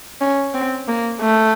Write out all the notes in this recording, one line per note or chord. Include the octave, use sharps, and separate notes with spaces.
C#4
C4
A#3
A3